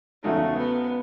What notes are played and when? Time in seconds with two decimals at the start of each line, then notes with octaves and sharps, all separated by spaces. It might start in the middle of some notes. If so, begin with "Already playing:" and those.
0.24 E2 C#3 G#3 A3 D#4 F#4
0.57 B3